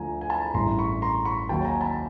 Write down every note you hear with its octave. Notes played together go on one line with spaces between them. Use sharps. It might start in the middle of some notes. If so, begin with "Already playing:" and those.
Already playing: D2 D3 F3 G#5 A#5
G#5
A5
A#5
B5
A1 G2 E3 A#5 C6
B5 C#6
A#5 C6
B5 C#6
D#2 D#3 F#3 G5 A5
G#5 A#5
A5 B5